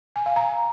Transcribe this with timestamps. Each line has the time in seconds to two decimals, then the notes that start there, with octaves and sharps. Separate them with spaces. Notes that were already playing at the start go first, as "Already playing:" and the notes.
0.16 G#5
0.26 F5
0.36 A#5